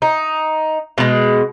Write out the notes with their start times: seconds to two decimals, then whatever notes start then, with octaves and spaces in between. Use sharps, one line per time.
0.02 D#4
0.98 B2 G#3